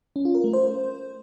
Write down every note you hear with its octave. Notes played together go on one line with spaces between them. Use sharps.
C#4
F4
A#4
A3
C5